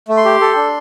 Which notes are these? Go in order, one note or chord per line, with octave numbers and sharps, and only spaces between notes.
A3
C6
G4
A4
D4